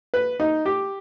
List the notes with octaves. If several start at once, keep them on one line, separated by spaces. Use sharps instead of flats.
B4
D#4
G4